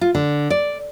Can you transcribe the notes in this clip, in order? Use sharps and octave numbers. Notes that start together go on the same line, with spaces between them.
F4
D3
D5